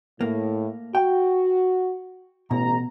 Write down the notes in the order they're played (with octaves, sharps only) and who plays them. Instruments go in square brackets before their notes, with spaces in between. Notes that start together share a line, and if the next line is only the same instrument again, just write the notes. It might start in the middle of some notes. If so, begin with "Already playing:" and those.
[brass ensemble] A2 [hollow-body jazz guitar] A#3
[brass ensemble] F#4 [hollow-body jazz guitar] G5
[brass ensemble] A1 A#5 [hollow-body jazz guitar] B2